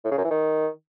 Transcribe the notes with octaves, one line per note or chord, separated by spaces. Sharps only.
A2
C#3
F#2
E3
D#3